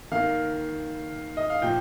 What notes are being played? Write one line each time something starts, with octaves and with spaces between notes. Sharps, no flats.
D#3 A#3 F5
D#5
F5
A#2 F3 G5